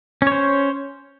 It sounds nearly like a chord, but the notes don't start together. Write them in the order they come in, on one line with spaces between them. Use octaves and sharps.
C#4 C#5 C5